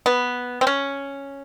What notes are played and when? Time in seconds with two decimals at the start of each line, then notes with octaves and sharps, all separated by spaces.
0.06 B3
0.61 C4
0.67 C#4